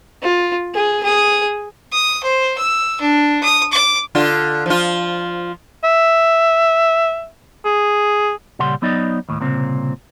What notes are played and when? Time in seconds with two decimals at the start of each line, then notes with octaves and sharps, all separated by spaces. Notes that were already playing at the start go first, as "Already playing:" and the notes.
0.22 F4
0.74 G#4
1.03 G#4 D#6
1.92 D#6
2.23 C5
2.58 E6
3.01 D4
3.43 D#6
3.72 D6
4.15 D3 F4
4.66 F3 F4
5.84 E5
7.65 G#4
8.59 A#2 C#3 G3 F#5 C6
8.82 F#3 B3 D#4 D5 D#5
9.29 D#2 A2
9.40 C2 A#2 C#3 C4